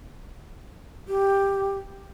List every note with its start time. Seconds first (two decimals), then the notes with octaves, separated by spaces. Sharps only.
1.09 G4